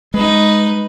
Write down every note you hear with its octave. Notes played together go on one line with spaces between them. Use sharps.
G#3 D#4 B4